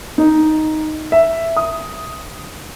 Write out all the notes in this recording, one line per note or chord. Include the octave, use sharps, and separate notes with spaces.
D#4
E5
D#6